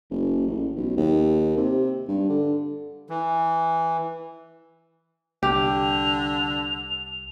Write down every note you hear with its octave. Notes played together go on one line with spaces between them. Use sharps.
F#1
A1
B1
D#2
C3
G2
D3
E3
C2 D3 G4 F7